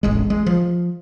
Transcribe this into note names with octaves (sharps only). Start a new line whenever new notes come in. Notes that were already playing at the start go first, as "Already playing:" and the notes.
E1 A1 G#3
G#3
F3